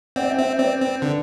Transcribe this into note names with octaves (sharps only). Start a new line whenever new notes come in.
C4 D5 F#5
E5 G5
C4
C5 E5
C4 B4 D5
C4
D3